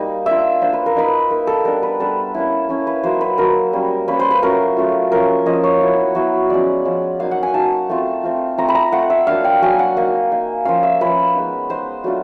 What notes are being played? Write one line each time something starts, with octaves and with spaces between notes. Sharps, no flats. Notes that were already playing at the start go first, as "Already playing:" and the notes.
Already playing: G3 A#3 D#4
A#3 D4 F4 E5
A#3 D4 F4 C5
B4
A#4
A#3 D#4 B4
A#3 D#4 A#4
A4
G3 B3 D4 A#4
B4
G3 B3 D4 A4
A#3 C#4 E4
A#3 C#4 E4
B4
F#3 A#3 D#4 C5
B4
F#3 A#3 D#4 A#4
G3 A#3 C#4
G3 A#3 C#4 B4
C5
B4
F#3 A3 C#4 F4 A#4
F#3 A3 C#4 F4
F3 A#3 C#4 F4 A#4
F3 A#3 C#4 F4 D#5
C#5
F#3 B3 E4
F#3 B3 E4
F3 G#3 C#4 D5
F3 G#3 C#4
F#3 A#3 D#4 F5
F#5
G#5
F#3 A#3 D#4 A5
A3 C4 F4
A3 C4 F4
A3 C4 F4 A#5
B5
A#5
A3 C4 F4 F#5
E5
F#3 A#3 D4 F5
G5
F#3 A#3 D4 G#5
F#5
A#3 D#4 F5
A#3 D#4
F3 A#3 C#4 F4 F5
E5
F3 A#3 C#4 F4 B4
G#3 B3 D#4
G#3 B3 D#4 C5
F#3 A3 D4 F4